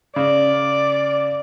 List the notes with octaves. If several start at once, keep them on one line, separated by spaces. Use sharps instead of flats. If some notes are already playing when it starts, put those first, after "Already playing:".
C#3 D5